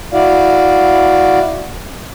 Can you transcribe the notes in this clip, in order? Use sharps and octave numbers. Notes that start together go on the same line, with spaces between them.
E4 F#4 D5 F5